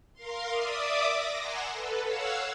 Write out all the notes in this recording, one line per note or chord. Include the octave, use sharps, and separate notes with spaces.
A#4 F5 C6
D5 E5 D6 D#6
A#6
F#5 G#5 A#5 C6 E6
A4 B4
C#5 F5 F#5 E6